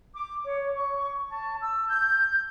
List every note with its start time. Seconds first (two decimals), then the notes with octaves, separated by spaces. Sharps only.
0.13 D6
0.44 C#5
0.74 C#6
1.30 A5
1.59 E6
1.86 G6